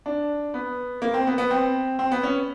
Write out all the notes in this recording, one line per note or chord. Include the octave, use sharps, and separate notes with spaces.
D4
B3
A#3
C4
B3
B3
C4
C4
B3
C#4